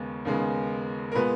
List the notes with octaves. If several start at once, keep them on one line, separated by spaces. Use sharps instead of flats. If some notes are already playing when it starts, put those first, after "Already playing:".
Already playing: D#2 C#3 G#3 B3
D#2 C#3 G#3 B3
A#4
A#2 G#3 B3 B4